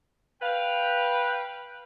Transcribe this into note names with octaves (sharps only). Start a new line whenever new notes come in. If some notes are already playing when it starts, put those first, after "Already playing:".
B4 F5 G5